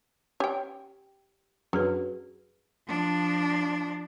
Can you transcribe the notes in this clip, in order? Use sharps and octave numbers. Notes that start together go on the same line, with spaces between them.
C#4 G4 G5
F#2 D3 F#4 G#4 B4
F3 D4